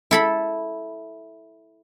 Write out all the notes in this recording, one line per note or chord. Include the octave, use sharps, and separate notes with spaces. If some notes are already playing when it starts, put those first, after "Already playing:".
E4 A4 B5